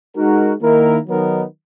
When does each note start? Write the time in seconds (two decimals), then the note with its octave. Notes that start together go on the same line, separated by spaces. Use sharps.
0.17 G#3 D#4 F#4 A#4
0.62 D#3 A#3 E4 A#4
1.07 D#3 F#3 B3 D#4 A#4